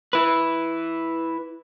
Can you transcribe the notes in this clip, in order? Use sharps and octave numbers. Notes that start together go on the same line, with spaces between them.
E4 B4